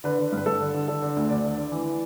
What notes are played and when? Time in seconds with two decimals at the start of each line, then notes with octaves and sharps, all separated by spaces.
0.04 D3 B4
0.18 D3
0.32 G2
0.38 B4
0.46 G2 A4
0.61 D3
0.74 D3
0.88 D3 A4
1.02 D3
1.17 D2
1.30 D2 D5
1.44 D3
1.57 D3
1.72 E3
1.86 E3